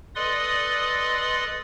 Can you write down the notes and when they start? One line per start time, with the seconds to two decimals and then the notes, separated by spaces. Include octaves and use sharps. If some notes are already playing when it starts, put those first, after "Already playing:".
0.15 A4 B4 D5 D#5 C6 D#6